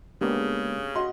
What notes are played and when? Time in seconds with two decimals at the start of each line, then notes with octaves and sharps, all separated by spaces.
0.21 C#3 G#3 A#3 B3 D4 G4
0.95 F#4 D#5 C6